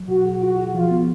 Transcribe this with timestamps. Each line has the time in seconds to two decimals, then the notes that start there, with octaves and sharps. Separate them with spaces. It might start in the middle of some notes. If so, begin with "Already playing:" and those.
Already playing: F#3
0.08 B2 F#4
0.25 G#4
0.41 F4 F#4
0.58 G#4
0.74 F3 F4
0.91 B3